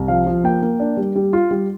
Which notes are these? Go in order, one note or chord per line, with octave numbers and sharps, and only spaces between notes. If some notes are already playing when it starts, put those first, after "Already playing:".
Already playing: C2
F3 F5
F3
A#3 G5
A#3
D4
G3
G3
F4
G3